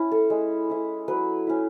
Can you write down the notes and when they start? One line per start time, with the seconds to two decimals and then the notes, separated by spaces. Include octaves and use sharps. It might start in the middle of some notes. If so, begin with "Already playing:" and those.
Already playing: C#4 E4
0.11 A4
0.30 G#3
0.70 C#4 E4
1.08 F#3 B4
1.47 C#4 E4